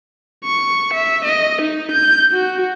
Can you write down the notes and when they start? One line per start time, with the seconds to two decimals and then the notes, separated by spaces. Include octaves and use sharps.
0.44 C#6
0.93 E5
1.24 D#5
1.61 D#4
1.91 G6
2.32 F#4